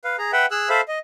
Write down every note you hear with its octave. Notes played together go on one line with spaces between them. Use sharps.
B4 F5
G#4 A#5
B4 E5 F#5 G5
G#4 E6 F#6
A4 C5 E5 F5 B5
D#5